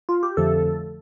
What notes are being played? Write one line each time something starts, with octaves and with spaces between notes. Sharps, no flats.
F4
G4
F2 D3 F3 A3 A4